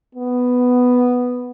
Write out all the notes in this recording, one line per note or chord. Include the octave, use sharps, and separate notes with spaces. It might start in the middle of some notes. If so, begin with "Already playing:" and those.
B3